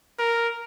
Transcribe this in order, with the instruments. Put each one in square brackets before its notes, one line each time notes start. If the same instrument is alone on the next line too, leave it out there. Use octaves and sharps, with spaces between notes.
[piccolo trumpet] A#4